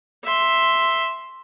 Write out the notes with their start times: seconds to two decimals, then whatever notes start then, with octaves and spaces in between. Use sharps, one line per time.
0.24 E5 C6